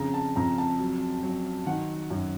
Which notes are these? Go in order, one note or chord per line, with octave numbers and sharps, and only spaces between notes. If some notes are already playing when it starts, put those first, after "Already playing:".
Already playing: F2 C#3 A#5
A5
F2 A#5
A5
F#3
F#3
D#3 F#5
F#2